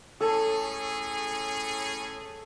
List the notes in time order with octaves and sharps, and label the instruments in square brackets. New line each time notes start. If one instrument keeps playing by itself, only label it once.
[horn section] A2 C#4 G#4 [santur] A4